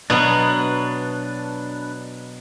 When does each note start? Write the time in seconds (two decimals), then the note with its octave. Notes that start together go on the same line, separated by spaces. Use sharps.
0.10 B2 F#3 D4 B4